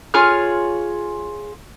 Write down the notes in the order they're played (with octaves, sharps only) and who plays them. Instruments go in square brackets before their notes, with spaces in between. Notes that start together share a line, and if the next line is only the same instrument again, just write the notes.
[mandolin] F4 G#4 C#5 F6